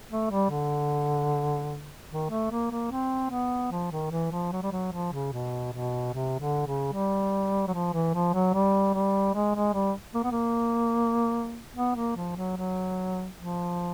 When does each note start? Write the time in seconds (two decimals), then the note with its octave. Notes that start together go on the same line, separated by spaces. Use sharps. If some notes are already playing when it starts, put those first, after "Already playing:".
0.10 A3
0.30 G3
0.50 D3
2.11 D#3
2.31 A3
2.52 A#3
2.71 A#3
2.91 C4
3.31 B3
3.72 F3
3.92 D#3
4.12 E3
4.31 F3
4.52 F#3
4.63 G3
4.72 F#3
4.93 F3
5.13 C#3
5.33 B2
5.73 B2
6.14 C3
6.40 D3
6.67 C#3
6.93 G3
7.68 F#3
7.74 F3
7.93 E3
8.15 F3
8.34 F#3
8.54 G3
8.94 G3
9.35 G#3
9.55 G#3
9.74 G3
10.15 A#3
10.24 B3
10.32 A#3
11.77 B3
11.96 A#3
12.17 F3
12.36 F#3
12.57 F#3
13.37 F3